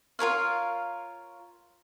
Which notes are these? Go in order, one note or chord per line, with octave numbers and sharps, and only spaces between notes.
F4 A#4 C#5 F5